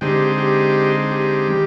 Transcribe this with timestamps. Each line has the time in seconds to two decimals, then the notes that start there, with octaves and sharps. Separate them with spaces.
0.01 D3 G#3 C4 D#4 G4
0.38 G4
1.11 G4
1.49 D#3 G3